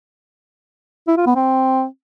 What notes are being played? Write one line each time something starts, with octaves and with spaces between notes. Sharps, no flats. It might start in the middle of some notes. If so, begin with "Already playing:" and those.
E4
F4
B3
C4